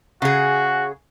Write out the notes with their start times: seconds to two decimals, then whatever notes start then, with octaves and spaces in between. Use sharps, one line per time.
0.22 C#3 F#4 G#4